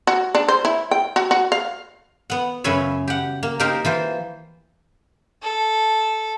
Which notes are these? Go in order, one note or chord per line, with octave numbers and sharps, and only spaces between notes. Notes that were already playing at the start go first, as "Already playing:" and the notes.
F#4
D4
C5
E4
G5
F#4
F#4
F5
B3 F#5
F#2 C#3 C#4 B4 C#5 E5
G4 F#5
A#3
A#3 D#4 G4 A#4 C5
E3 F4 C5
A4